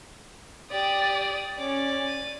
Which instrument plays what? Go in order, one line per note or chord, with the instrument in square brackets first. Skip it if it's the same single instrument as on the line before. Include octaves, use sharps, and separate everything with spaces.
[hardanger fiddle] G4 [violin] D5 D#6
[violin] C#4 [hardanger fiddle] D5
[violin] D#7